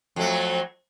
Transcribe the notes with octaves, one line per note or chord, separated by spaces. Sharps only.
F2 F#3 A3